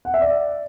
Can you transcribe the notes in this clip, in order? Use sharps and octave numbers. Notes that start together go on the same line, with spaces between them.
F#5
E5
D5